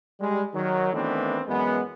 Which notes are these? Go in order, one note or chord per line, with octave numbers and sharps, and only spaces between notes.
G3 G#3
D#3 F#3
D#3 E3 A3 B3 C4 D4
F#2 E3 G#3 B3